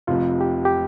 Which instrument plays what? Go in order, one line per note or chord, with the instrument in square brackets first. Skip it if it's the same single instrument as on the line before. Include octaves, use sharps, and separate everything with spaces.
[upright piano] F1 F2 C3 F3 [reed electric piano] F4
[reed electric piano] G4
G4